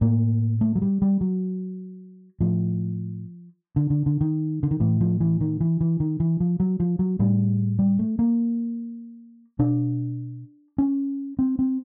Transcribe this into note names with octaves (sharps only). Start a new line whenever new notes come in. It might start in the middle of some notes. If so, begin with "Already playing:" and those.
A2 A#3
A3
F#3
G3
G3
F#3
A2 F3
D3
D3
D3
D#3
D3
D#3
A2 E3
F3
E3
D#3
E3
E3
D#3
E3
F3
F#3
F3
F#3
A2 G3
G3
A3
A#3
B2 D4
C#4
C4
C4